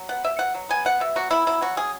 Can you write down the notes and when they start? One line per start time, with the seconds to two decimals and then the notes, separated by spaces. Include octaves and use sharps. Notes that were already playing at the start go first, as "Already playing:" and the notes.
Already playing: F#3
0.09 B3 F#5
0.24 B2 E5
0.39 B2 F#5
0.54 F#3
0.69 B3 G#5
0.85 B2 F#5
1.00 B2 E5
1.16 F#3 F#4
1.31 B3 E4
1.47 F#3 E4
1.61 F#3 F#4
1.77 C#4 G#4